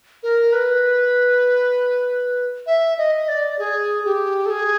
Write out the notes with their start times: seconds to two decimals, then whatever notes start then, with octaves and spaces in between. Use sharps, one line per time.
0.23 A#4
0.53 B4
2.66 E5
2.98 D#5
3.28 D5
3.59 G#4
4.05 G4
4.46 A4
4.50 G#4